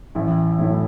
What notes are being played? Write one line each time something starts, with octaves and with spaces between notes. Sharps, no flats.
A1 E4
A2 F#3 A3 E4